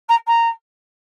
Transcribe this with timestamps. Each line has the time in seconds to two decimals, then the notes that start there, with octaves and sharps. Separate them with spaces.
0.09 A#5
0.27 A#5